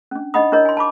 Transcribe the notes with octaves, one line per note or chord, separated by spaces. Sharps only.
C#4 D4
D4 D#4 D#5 F#5 B5 D#6
D4 E4 A#4 C#5 D#5
G#5 C6
A5 B5 D6